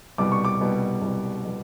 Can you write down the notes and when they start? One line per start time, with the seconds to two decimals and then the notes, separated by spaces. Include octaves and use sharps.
0.18 C2 B2 G3 D6
0.32 C#6
0.45 D6
0.60 C2 B2 G3
1.01 C2 B2 G3
1.45 B2 G3